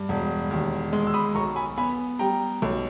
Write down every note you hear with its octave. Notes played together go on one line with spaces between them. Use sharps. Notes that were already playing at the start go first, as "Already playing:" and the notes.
Already playing: G2
E1
D#2
G#3
E6
B5 D#6
B1 A#5 C#6
G#5 B5
B3 G#5 B5
G3 G5 A#5
B1